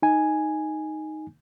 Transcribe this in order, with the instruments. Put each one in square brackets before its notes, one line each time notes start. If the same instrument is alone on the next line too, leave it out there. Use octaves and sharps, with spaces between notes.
[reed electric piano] D#4 G#5